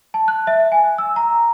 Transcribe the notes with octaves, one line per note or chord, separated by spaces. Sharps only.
A5
F#6
E5
G#5
E6
A#5